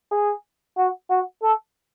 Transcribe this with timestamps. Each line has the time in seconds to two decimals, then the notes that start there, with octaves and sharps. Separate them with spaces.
0.11 G#4
0.77 F#4
1.10 F#4
1.42 A4